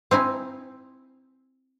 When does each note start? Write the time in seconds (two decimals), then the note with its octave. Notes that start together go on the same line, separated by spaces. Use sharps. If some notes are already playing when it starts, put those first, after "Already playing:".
0.11 C4 D#4 E4 G#5